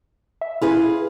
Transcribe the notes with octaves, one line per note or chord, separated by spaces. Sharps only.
E5
E4 F4 G#4 B4